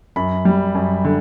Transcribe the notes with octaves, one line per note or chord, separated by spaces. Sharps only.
F#2 B5
G3
F#2
D3